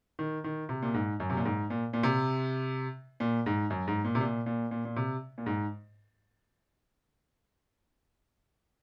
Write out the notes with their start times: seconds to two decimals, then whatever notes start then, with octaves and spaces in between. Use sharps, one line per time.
0.19 D#3
0.44 D#3
0.69 C3
0.82 A#2
0.94 G#2
1.20 F#2
1.30 C3
1.37 A#2
1.45 G#2
1.70 A#2
1.93 A#2
2.03 C3
3.20 A#2
3.46 G#2
3.70 F#2
3.88 G#2
4.04 A#2
4.15 C3
4.21 A#2
4.46 A#2
4.71 A#2
4.85 A#2
4.96 C3
5.38 A#2
5.46 G#2